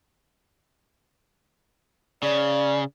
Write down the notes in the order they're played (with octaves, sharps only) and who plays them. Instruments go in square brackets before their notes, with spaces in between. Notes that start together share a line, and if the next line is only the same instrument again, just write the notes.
[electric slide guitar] C#3 [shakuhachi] D5